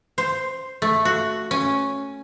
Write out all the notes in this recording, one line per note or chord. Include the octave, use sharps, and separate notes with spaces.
C5
A3
F#4
C#4